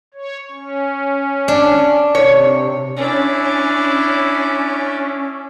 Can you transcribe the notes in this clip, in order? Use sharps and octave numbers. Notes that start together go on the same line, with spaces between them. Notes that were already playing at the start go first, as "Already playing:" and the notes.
C#5
C#4
D4
C3 C#5
C#4 D4 E4